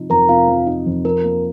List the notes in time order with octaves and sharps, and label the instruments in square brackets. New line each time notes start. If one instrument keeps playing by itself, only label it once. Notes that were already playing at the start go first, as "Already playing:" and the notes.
Already playing: [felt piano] C3 F3 D#4
[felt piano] F2 [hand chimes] A#4 A#5
[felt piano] C3 [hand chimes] F4 F5
[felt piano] F3
D#4
F2
[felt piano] F3 [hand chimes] A#4
[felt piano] A#3